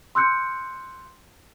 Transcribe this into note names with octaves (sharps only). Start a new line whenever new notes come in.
C6 E6 F#6 G6 C#7